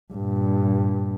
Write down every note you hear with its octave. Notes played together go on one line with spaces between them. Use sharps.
G2 A#2